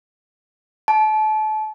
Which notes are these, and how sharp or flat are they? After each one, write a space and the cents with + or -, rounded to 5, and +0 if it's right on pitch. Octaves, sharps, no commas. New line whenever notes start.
A5 -30